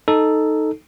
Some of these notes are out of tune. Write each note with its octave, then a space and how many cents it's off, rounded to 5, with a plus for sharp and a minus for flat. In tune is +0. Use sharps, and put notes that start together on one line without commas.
D#4 +0 A4 +0